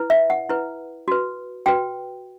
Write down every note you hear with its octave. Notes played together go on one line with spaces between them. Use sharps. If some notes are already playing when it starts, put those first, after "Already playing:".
Already playing: E4 B4
E5
F#5
E4 B4
F#4 B4
F#4 B4 G5